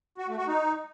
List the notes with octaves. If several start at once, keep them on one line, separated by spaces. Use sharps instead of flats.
F#4
A3
F#4
D#4